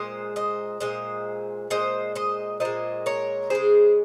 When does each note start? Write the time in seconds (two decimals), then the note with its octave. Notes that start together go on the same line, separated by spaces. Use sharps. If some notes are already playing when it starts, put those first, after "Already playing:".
Already playing: A#2 G#3 C5 D#5
0.36 C5 D#5
0.80 A#2 G#3 C5 D#5
1.70 A#2 G#3 C5 D#5
2.15 C5 D#5
2.60 A#2 G#3 C5 D#5
3.06 A#4 C#5
3.50 C#3 G#3 G#4 C5